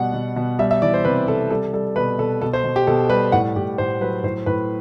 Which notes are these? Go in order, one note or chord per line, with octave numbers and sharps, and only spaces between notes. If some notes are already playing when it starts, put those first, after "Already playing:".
Already playing: B2 G3 F#5
B2
B2
G3 E5
E5
E3 D5
C5
C3 B4
C3 A4
G3 A4
G3 A4
B2 B4
B2 A4
B2 A4
C5
B2
G4
B2 A4
G3 B4
A2 F#5
A2 G4
A2 C5
F#3 B4
A2 C5
A2 B4